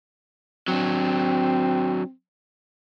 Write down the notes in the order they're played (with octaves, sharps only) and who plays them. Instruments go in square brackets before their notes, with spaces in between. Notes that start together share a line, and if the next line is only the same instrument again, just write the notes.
[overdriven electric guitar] F#3 D4 [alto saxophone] C4